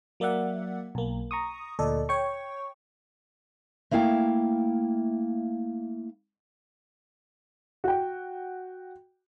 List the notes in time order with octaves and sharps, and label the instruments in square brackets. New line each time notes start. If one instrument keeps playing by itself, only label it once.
[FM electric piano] F#3 A#3 D5 E5 F#5
B1 A#3
A#5 C#6 D#6
D2 A#2 A4 D5 D#5
C#5 G5 C#6
[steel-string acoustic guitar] A3 A#3 E4 F5 G5
[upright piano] F#4 G5